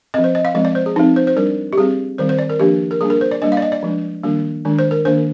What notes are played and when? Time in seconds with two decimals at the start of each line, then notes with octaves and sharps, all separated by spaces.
0.14 C4 D#5
0.18 F3
0.24 C5
0.35 D#5
0.45 F5
0.55 F3 G#3 C4 D#5
0.65 D5
0.75 C5
0.86 G#4
0.96 F3 C4 D#4
1.16 C5
1.27 C5
1.36 G3 D4 A#4
1.73 G4
1.78 G3 C4 G#4
2.18 D#3 G3 C4 C5
2.29 C5
2.39 D5
2.50 A#4
2.60 F3 A#3 D4 G4
2.91 A#4
3.01 G3 A#3 D4 G#4
3.10 A#4
3.21 C5
3.31 D5
3.42 G3 A#3 D4 D#5
3.52 F5
3.57 D5
3.62 D#5
3.72 D5
3.83 F3 G#3 D4
4.23 D#3 G3 A#3 D4
4.65 D#3 G#3 D4
4.79 C5
4.91 A#4
5.05 D#3 A#3 D4 C5